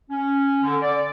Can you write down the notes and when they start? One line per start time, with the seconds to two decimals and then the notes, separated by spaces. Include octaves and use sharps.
0.10 C#4
0.63 D3
0.82 D5